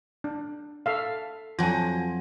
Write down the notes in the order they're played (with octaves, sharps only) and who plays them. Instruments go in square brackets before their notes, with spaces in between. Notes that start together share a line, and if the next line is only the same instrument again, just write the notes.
[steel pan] D4
A4 E5 F5
[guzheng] F2 F#3 [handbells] F4 G#5